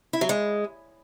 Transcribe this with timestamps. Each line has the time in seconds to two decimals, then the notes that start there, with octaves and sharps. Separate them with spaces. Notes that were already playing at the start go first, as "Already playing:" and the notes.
0.13 E4
0.21 F#3
0.29 G#3